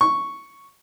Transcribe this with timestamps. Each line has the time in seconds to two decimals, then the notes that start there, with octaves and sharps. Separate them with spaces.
0.01 C#6